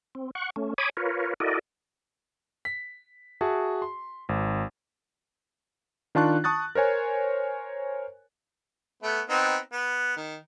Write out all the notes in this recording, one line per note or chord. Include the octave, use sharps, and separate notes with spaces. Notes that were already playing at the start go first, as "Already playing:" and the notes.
C4
F#5 C#6
A3 C#4
C#5 G#5 B5 D6 D#6
F4 A#4 B4 C#5
E4 F#4 A4 A#4 D5 D#5
B6
F#4 G#4 E5 A5
C6
G#1
D#3 D4 F4 A5 C#6 F#6
A5 C#6 D#6 F#6 A6
A#4 C5 C#5 G#5
A3 B3
B3 C4 D#4
B3
D#3